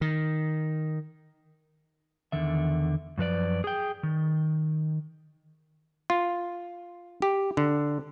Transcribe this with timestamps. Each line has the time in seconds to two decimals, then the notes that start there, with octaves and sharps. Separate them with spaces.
0.01 D#3
2.32 E2 D3 D#3 E5
3.18 F#2 F3 B4 D5
3.64 G#4 G5
4.03 D#3
6.10 F4
7.22 G4
7.57 D3